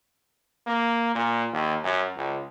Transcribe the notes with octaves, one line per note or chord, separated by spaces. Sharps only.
A#3
A#2
D#2
F#2
C#2